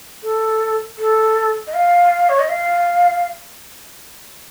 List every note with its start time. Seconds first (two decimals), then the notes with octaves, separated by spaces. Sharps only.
0.23 A4
0.98 A4
1.67 D#5
1.74 F5
2.29 C#5
2.39 D#5
2.49 F5